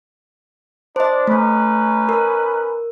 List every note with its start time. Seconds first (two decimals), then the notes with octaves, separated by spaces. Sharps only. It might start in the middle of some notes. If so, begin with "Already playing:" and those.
0.96 D4 C5 D#5
1.27 A3 C#4 D#4 B4
2.09 A#4